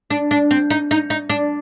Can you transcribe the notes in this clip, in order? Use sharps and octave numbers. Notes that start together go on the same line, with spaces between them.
D4
D4
C4
D#4
D#4
D#4
D4